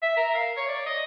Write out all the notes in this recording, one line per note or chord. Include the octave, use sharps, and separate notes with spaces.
E5
A#4
F5
C#5
D5
D#5